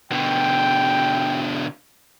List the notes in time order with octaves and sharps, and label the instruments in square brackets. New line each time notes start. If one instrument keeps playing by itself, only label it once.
[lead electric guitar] B2 D3 [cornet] G5